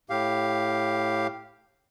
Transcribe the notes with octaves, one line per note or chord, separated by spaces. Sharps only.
A2 G4 F5